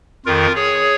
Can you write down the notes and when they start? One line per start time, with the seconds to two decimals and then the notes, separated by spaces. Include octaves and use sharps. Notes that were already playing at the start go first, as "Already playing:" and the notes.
0.26 F2 D#3 F4 A#4
0.55 G#4 C#5